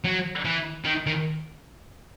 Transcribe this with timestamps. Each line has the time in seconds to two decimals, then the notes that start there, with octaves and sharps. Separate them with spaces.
0.04 F#3
0.45 E3
0.85 D#3
1.07 D#3